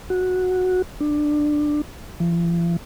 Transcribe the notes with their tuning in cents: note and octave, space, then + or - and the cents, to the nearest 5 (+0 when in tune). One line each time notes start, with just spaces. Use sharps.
F#4 -10
D4 +15
F3 -45